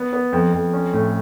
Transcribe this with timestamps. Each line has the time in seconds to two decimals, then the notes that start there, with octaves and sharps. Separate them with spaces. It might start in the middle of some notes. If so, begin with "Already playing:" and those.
Already playing: B3
0.13 B3
0.32 F2
0.53 F2
0.73 C#4
0.93 A2